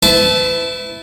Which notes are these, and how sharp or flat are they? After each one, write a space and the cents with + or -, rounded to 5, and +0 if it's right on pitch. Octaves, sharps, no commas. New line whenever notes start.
E4 +0 B4 +40 A5 -15